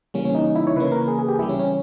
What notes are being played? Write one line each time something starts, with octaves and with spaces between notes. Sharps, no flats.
C#3 E3 G3 A#3 C#4
C#4
D#4
E4
C#5
C#3 E3 A#3 B4
A#4
G#4
G#4
G4
C#3 E3 G3 E4
C#4
C#4